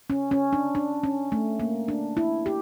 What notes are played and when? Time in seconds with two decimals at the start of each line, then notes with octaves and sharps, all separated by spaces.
0.10 C#4
0.31 C#4
0.53 D4
0.75 D4
1.03 C#4
1.32 A3
1.60 A#3
1.88 D4
2.17 E4
2.46 G4